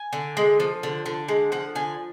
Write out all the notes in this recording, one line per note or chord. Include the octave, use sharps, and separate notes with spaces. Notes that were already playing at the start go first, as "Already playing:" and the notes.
Already playing: G#5
D3
G#3
F3
D3
D3
G#3
F3 F#5
D3 G#5